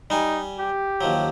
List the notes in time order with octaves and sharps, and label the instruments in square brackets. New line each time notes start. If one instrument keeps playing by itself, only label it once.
[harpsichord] G3 G#5 [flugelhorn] D#4
[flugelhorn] G4
[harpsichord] D#2 F3 F#3